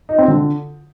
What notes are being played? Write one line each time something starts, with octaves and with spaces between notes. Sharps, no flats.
D#4
C4
D3